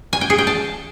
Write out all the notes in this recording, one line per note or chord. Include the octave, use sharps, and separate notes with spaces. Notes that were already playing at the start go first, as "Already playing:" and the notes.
G#5
G5
G#4
G5
A5